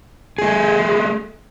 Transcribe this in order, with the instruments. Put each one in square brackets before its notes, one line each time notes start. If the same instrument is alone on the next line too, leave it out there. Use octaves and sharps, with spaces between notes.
[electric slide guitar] A3 G#4